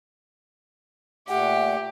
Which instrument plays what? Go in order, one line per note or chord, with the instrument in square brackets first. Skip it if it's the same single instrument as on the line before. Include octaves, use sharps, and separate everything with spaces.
[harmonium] A#2 A3 [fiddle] G4 [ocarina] F#5